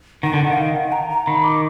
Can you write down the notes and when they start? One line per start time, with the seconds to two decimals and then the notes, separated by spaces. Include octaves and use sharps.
0.23 D#3 F#5
0.33 D3
0.43 D#3
0.49 F#5
0.53 F5
0.75 F#5
0.92 A#5
1.10 A#5
1.26 D#3 B5
1.44 D6